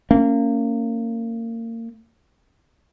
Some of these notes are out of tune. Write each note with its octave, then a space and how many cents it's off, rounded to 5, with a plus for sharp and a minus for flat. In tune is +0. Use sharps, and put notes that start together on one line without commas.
A#3 -30 C#4 +0